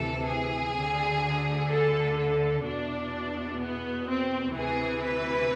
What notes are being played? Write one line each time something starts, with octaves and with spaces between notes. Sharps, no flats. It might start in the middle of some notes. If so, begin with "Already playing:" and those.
Already playing: D2 C3 E3 A4
G#4
D2 D3
A4
A4
E2 B2 D4
B3
C4
D2 C3 E3 G#4
B4